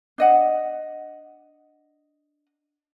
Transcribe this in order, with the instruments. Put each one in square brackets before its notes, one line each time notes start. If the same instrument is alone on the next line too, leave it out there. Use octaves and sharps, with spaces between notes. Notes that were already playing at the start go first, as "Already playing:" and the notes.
[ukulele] D4 D#5 F#5